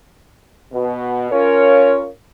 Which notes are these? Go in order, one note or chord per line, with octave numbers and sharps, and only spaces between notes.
B2
C#4 F4 A#4 C#5